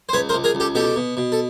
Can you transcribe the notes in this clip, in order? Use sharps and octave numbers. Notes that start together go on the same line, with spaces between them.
C5
C#2 B4 C#5
A#4 C5
C#2
G#4 A#4
C#2
G4 A4
B2 G4 A4
B2
B2
A4